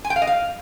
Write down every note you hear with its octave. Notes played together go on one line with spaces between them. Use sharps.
G#5
G5
F5
D#5
F5